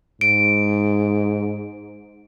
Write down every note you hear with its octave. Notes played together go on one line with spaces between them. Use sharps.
G#2 D7